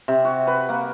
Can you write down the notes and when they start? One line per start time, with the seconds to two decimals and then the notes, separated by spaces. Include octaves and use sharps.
0.08 C3
0.25 F#4
0.47 B4
0.69 A#3